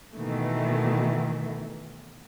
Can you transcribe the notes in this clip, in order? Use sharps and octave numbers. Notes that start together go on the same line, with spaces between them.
B2 D#3 E3 A3